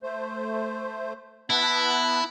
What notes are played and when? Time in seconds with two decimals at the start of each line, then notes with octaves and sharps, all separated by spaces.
0.03 A3 C5
1.50 B3 E4 A5 F#6